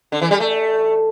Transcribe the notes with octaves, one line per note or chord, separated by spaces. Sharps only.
D3
E3
G3
A3